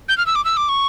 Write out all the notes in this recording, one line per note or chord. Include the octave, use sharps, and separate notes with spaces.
G6
F6
E6
D6
E6
D6
C#6